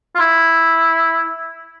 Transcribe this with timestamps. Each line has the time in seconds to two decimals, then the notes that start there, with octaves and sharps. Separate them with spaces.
0.15 F4
0.20 E4